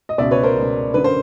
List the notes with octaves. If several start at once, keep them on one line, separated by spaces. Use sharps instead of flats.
D#5
C#2 B2 D5 E5
B4 C#5
A#4 C5
C#2 B2
F#2 D3 B4
A#4 C5